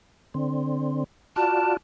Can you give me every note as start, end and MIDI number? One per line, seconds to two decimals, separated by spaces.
0.34 1.04 50
0.34 1.04 60
1.36 1.77 65
1.36 1.77 66
1.36 1.77 74
1.36 1.73 81